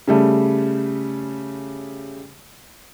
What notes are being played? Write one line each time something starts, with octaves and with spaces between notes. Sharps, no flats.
C#3 G3 A3